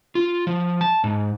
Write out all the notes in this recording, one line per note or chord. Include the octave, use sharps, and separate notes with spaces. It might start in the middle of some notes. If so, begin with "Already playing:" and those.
F4
F3
A5
G#2